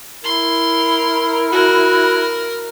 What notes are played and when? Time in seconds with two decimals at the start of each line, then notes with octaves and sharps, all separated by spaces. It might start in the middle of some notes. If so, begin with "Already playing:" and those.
0.24 E4 A#4 C6
1.52 F#4 A#4